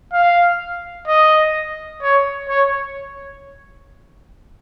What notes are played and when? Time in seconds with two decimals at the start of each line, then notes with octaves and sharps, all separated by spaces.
0.13 F5
1.08 D#5
2.02 C#5
2.49 C#5